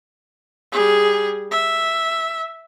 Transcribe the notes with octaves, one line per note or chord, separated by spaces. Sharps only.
G3 G#4
E5